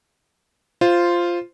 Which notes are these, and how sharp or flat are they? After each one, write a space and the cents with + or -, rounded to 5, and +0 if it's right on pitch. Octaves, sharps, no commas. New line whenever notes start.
F4 -5 C5 +0